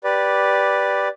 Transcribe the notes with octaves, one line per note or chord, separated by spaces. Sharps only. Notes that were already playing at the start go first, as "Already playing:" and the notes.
G4 B4 D5